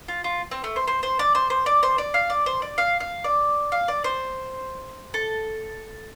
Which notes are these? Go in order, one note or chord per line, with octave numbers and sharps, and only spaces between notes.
F4
F4
C4
A3
C5
C5
C5
D5
C5
C5
D5
C5
D5
F5
D5
C5
D5
F5
F5
D5
F5
D5
C5
A4